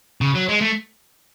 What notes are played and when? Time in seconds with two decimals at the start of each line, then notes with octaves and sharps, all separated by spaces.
0.21 C#3
0.35 F#3
0.49 G#3
0.61 A3